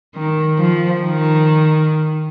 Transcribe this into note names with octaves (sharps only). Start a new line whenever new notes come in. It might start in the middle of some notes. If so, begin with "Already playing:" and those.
D#3
F3
D#3